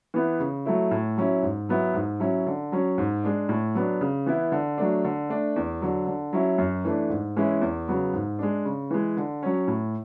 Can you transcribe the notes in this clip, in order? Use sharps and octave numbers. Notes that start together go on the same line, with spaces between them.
E3 B3 E4
C#3
F#3 A3 E4
A2
F#3 C#4 E4
G#2
F#3 B3 E4
G#2
F#3 C#4 E4
D3
F#3 C#4
G#2
G#3 D4
A2
F#3 B3 D4
C#3
E3 B3 E4
D3
F#3 A3 D4
D3
A3 D4
E2
D3 F#3
D3
F#3 C#4 E4
F#2
E3 A3 D4
G#2
E3 G#3 C#4 E4
E2
C#3 F#3 B3
G#2
G#3 D4
C#3
E3 G#3
D3
F#3 C#4
A2